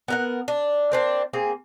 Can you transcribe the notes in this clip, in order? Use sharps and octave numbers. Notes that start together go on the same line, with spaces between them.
B3 A#4 F#5
D4
A#3 C4 D4
A#3 C4 G#4